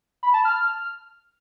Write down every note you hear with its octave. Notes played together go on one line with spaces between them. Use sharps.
B5
A5
F6